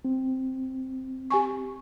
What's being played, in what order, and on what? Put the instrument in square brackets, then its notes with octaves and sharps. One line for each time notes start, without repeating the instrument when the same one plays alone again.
[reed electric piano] C4
[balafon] G4 G#5 C#6